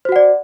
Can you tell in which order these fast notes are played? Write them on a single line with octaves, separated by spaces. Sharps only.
C5 F#4 F#5 D5